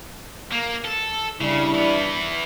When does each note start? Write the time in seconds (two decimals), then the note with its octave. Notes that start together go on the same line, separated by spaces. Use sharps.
0.52 A#3
0.85 A4
1.41 C#3 G3 D4 E4
1.74 E3 B3